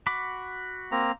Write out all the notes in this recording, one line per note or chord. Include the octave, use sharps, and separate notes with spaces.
F#4 B5 D6
A#3 C4 A#5